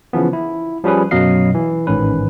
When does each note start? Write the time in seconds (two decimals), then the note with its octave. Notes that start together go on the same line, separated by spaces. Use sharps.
0.13 C#3 E3 F3 B3
0.33 E4
0.84 F3 G3 C#4 G#4 B4
1.11 F#2 B2 F#3 D#5 F5 C7
1.55 E3
1.87 A1 G#2 D#3 C#4 B4